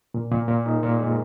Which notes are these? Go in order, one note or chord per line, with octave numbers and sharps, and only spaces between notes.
A#2
A#2
A#2
D#4
A#2
G#3